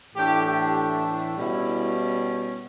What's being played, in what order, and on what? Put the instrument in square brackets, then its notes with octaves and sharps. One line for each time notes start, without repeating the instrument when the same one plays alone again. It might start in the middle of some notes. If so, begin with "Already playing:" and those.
[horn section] A2 E3 A3 D4 G4
G4
B2 G3 C#4 E4